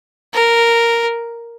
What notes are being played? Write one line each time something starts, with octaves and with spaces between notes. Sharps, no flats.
A#4